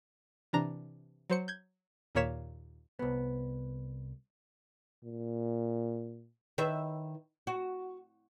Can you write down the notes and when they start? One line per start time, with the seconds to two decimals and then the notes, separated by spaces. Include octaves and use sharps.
0.53 C3 E3 D4 A#5 A#6
1.30 F#3 C5 C#7
1.48 G6 G#6
2.15 D#2 A#2 A#3 C#5 B6 E7
2.99 C2 B3
5.04 A#2
6.58 D#3 B4 E5
7.47 F#4